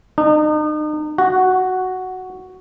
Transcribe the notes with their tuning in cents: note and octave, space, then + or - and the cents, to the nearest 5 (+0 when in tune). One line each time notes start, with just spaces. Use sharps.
D#4 -40
F#4 +0